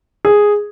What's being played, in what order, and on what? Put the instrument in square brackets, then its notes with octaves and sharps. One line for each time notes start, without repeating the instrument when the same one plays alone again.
[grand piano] G#4